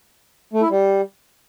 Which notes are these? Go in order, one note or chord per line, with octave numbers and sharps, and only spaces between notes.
A3
E4
G3